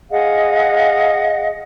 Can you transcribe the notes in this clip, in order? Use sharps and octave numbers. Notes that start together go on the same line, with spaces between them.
G#4 D#5 F5 F#5